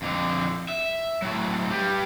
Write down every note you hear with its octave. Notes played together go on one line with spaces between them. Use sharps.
F2 D3
E5
A2 F#3
G4 B4